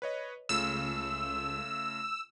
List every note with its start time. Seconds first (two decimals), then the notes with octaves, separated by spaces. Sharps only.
0.02 B4 C#5 D#5
0.49 C#2 C#3 A3 F4 E6